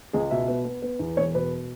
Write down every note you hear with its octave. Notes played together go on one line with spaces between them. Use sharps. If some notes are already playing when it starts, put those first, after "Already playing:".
C#2 G#4
B2 E5
B3
B3
B3
E2
E1 C#5
B2 B4